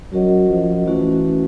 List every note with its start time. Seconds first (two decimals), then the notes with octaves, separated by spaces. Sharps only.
0.12 F#3 C#4 F#4 A#4 D#5 F#5
0.50 F3
0.87 E3 A3 C#4 F#4